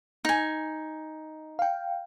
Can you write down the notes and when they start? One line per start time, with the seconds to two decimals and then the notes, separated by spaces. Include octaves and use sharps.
0.25 D#4 G#5
1.59 F5 G5